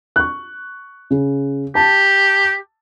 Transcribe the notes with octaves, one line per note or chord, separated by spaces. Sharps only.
C#6 F#6
C#3
G4 A5